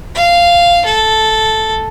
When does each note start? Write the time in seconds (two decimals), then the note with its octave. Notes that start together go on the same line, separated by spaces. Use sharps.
0.15 F5
0.85 A4